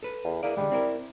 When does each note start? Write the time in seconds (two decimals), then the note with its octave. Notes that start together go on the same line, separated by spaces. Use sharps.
0.03 A4 B4
0.24 E2
0.43 A#3 E4 G#4 D5
0.57 D3 D#3 G3 G#3
0.72 C4 E4 A#4